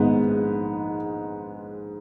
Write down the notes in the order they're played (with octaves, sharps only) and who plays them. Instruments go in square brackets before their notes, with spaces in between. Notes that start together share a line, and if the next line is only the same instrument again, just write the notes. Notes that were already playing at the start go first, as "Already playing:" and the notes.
Already playing: [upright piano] A#1 G#2 D#3 G#3 B3